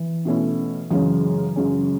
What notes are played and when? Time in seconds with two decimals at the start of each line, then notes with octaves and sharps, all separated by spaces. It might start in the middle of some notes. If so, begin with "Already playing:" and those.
Already playing: E3
0.25 B2 A3 C#4 E4
0.91 F#2 C#3 E3 G#3 C#4
1.56 F#2 C#3 G#3 C#4